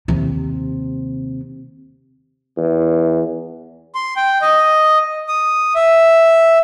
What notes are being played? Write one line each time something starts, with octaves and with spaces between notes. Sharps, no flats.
D#2 C3
E2
C6
G5
D#5
D#6
E5